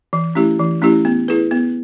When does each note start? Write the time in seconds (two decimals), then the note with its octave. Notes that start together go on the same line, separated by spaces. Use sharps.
0.13 E3
0.35 A3 C#4 E4 G4
0.59 E3
0.82 A3 C#4 E4 G4
1.05 B3
1.28 E4 G#4 B4
1.51 B3